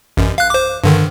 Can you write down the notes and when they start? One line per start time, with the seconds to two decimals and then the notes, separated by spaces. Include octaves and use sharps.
0.17 A1 F#2
0.38 F5 F#6
0.50 C5 D6
0.84 G2 D3 D#3